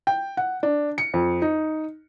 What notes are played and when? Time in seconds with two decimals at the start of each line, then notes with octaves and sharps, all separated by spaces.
0.07 G5
0.37 F#5
0.63 D4
0.98 C#7
1.14 F2
1.42 D#4